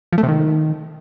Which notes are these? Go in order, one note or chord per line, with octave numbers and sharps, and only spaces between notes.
F3
A3
C3
D#3